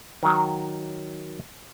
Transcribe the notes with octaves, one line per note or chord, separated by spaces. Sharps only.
D#3 F#3